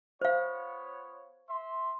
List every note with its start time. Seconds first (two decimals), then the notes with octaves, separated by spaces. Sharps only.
0.21 B3 F4 C5 C#5 F5
1.48 E5 C6